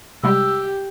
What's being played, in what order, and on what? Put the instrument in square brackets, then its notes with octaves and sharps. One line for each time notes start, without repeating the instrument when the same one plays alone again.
[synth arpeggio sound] C3 G3 G#3 [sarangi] G4 [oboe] E6